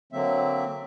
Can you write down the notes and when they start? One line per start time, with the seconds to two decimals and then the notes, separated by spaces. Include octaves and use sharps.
0.13 D3 F#3 A#3 C4 E5